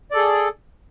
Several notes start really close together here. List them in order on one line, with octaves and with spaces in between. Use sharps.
D5 A4 G#4